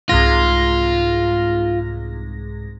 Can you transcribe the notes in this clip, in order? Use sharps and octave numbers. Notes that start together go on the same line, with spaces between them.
C2 G#2 F4 A#6